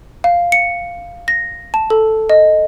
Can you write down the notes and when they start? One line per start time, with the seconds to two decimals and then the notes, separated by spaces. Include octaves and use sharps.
0.24 F5
0.52 C#7
1.28 A#6
1.74 A5
1.90 A4
2.30 D#5